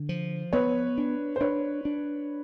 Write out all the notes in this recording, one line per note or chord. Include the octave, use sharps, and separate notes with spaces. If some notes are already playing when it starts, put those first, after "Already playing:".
Already playing: D3
F3
B3 B4 C#5
D4
C5
D4 B4 C#5
D4